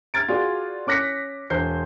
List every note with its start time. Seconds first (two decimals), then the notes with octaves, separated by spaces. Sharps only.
0.14 F6 G#6 A6 D7
0.29 F4 F#4 G#4 D5
0.87 C#4 D6 F#6 A#6 B6 C#7
1.50 E1 C5 G6 C7